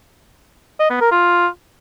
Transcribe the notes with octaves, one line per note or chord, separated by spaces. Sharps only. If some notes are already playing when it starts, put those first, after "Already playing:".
D#5
B3
A#4
F4